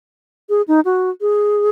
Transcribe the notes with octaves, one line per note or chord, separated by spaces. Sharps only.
G#4
D#4
F#4
G#4